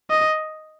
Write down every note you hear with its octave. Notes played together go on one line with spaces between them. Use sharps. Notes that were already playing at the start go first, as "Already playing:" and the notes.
D#5